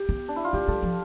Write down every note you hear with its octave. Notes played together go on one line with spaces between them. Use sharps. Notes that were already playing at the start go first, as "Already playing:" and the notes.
Already playing: G4
B3
D4
E4
F4
A3 G4
G3 A4
F3